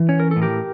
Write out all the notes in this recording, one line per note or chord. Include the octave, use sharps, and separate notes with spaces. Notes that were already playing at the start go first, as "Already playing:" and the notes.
Already playing: E3
C#4 C#5
A#4
A4
A2
G4 A#4